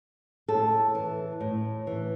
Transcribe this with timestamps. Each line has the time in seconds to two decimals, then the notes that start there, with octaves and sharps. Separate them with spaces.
0.48 A2 A4
0.95 E3
1.41 A2
1.87 E3